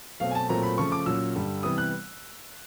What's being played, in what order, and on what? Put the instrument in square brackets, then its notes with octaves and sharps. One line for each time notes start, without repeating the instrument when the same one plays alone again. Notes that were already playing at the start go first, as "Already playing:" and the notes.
[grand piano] B2 F#3 A3 C4 F5
G#5
A5
A#2 F#3 A3 C4 A#5
B5
C#3 F3 A3 C#4 C#6
D6
A#2 F#3 A#3 C#4 E6
G2 D3 G3
C3 E3 G3 B3 D#6
F#6